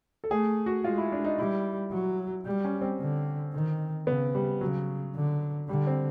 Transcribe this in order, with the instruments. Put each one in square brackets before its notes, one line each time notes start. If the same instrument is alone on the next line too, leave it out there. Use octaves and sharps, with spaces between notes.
[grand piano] A4
[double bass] A3 [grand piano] G#4
[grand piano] F#4
[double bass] G#3 [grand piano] F4
[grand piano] E4
D4
D#4
[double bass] G3 [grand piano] E4
[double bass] F#3
G3
[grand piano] C#4
C4
[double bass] D3
D#3
[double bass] C#3 [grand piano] B3
[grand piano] G3
[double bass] C#3 [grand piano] F#3
[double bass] D3
[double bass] D3 [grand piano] G3
[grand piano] C4